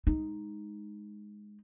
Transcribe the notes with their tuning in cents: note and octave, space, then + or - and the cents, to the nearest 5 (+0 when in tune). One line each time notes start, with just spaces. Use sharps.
G#3 +0 D#4 +0